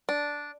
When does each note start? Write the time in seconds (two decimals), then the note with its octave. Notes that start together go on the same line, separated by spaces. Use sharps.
0.09 D4